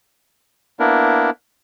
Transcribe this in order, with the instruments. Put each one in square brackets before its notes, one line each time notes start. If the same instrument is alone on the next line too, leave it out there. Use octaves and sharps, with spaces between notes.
[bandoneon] A#3 B3 D4 E4 A#4